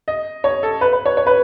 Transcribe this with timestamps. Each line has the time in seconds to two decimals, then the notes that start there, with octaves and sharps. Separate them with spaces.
0.08 D#5
0.44 C#5
0.63 A4
0.81 B4
0.93 B4
1.06 C#5
1.17 C#5
1.27 B4